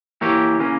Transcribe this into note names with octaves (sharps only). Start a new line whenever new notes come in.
E3 A#3 E4 G4 C#5
C#3 E3 A#3 C#4